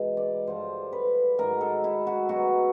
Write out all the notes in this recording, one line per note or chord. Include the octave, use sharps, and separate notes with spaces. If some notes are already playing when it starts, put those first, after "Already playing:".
Already playing: G#2 B2 E3
D5
G2 D3 F3 C5
B4
G#2 D#3 F#3 A#4
A4
E4
F#4
B2 F#3 F#4